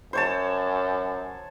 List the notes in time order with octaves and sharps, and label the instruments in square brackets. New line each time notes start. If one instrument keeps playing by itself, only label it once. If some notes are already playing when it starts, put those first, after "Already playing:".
[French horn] F#2 [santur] C5 C#5 A5